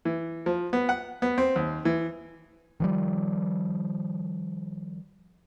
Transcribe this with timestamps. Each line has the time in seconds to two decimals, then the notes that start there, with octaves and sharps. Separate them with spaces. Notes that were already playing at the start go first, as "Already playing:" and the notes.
0.05 E3
0.46 F3
0.73 B3
0.89 F#5
1.22 B3
1.38 C4
1.56 D#2
1.85 E3
2.80 D#3 F3 G3